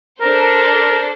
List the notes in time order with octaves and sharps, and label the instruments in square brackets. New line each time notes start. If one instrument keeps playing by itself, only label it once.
[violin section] D4 A4 C5 [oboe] A#4
[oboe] A#4